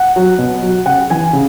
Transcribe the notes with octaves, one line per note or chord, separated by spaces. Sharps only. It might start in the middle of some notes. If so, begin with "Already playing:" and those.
Already playing: F#5
F#3
B2
F#3
C#3 F#5
E3 G#5
C#3